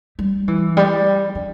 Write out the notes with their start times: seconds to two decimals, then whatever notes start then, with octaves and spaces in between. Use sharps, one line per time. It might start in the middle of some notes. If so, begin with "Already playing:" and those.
0.19 G3
0.48 E3
0.77 G3
1.35 D4